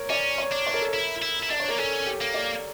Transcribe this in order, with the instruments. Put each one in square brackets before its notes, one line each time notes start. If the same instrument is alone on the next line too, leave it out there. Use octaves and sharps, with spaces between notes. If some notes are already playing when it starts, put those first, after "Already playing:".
Already playing: [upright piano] A#4 C#5
[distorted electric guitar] C#4 [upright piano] D5
[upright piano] C#5
[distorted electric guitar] D4
[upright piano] C#5
A#4
A4
A#4
[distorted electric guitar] E4
E4
E4
[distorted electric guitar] D4 [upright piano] D5
[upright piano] C#5
[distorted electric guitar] A#3 [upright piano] A#4
[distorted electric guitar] C#4 [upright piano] A4
[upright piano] G4
[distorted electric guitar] A#3
[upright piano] D5